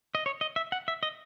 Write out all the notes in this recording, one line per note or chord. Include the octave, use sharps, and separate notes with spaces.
D#5
C#5
D#5
E5
F#5
E5
D#5